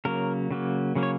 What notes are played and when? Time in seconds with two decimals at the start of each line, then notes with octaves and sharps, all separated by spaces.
0.05 C#3 F#3 A#3 A#4
0.51 C#3 F#3 A#3
0.95 C#3 F#3 A#3
1.03 C#5